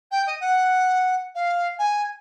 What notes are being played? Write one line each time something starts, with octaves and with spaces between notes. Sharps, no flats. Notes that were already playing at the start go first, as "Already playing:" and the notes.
G5
D#5
F#5
F5
G#5